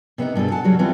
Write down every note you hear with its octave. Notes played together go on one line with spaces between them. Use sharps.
C3 B3 C#4 D#4
G2 B2 G#4 A4
F#5 G#5 A5
C#3 F#3 G3 F#4
E3 G3 B3 C4 E4 F4